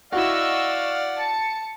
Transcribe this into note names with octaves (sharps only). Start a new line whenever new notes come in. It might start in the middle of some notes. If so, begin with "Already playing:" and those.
E4 F#4 D5 D#5 F5 F#5 C#6 E6
A5 C#7